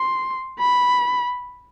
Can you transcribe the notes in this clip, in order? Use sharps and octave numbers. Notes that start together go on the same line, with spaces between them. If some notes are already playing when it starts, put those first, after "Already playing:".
Already playing: C6
B5